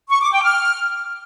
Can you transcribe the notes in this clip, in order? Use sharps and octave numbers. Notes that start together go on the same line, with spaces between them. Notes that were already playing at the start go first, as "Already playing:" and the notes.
C#6
D6
G5
F6